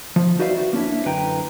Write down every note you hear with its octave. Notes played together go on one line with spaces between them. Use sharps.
F3
D#4 F#4 B4 D5 E5 F5
F#4
A#3 C#4 D4 E4
F#2 D3 B4 G5 A#5